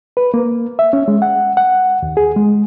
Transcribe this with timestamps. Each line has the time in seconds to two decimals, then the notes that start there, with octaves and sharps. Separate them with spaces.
0.17 B4
0.34 A#3
0.79 E5
0.93 C#4
1.08 G#3
1.22 F#5
1.57 F#5
2.03 D#2
2.17 G#4
2.36 G#3